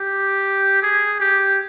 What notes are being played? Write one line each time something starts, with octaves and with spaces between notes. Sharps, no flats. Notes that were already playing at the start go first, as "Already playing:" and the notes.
Already playing: G4
G#4
G4